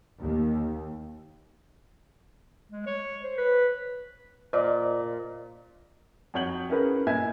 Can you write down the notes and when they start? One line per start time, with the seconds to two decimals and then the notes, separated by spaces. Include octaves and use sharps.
0.19 D#2
2.71 G#3
2.86 C#5
3.23 C5
3.38 B4
4.53 A#2 C5 D5 D#5
6.34 F2 F#4 C#5 G6 F#7
6.70 C#4 E4 G#4 A#4 B4
7.07 A#2 E4 D#5 E5 G#5 G#6